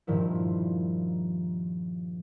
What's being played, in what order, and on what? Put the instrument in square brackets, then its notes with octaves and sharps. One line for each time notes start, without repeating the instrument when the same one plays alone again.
[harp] G2 A#2 D#3 F3 E4